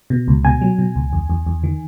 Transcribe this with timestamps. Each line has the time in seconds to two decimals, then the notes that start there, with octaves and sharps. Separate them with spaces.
0.10 B2
0.28 C#2
0.45 B2 G#5
0.61 F#3
0.79 B2
0.96 C#2
1.13 E2
1.30 E2
1.47 E2
1.64 D#3